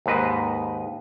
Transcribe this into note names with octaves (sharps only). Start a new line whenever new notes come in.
D#2 G#2 B4 D#5